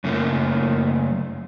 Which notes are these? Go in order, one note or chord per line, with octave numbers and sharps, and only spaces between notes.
F#2 C#3 A3 A#3